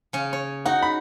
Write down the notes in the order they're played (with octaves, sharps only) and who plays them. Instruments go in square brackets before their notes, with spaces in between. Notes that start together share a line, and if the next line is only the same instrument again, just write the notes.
[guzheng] C#3 C#4
C#5
[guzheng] D#4 F#4 [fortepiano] F#5
[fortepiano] B5